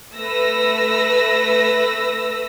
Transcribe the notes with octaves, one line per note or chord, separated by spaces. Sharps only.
A3 B4 E6 A#6